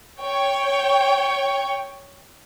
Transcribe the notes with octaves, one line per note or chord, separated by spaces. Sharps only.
C#5 G5